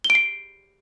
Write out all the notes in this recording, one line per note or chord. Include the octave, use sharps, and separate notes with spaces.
G7
D7
C7